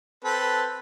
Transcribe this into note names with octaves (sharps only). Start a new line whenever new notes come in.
C4 A4 B4